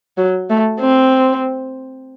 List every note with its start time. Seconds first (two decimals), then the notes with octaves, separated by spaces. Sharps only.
0.18 F#3
0.50 A3
0.80 C4